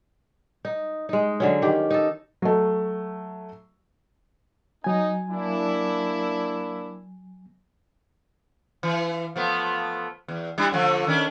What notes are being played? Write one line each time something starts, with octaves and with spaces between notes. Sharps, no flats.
D#4
G#3 D#4
D3 F#3 C#4
D#3 G4
D#4 A4
F#3 A3
F#3 D#4 G#5
A#3 D4 E4
E3
F3 A3 B3
E2
G3 D4 E4
D3 F3 A3
D#3 C#4 D4